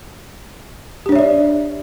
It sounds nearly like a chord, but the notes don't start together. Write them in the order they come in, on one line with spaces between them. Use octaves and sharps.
G4 D4 C#5 E5 D5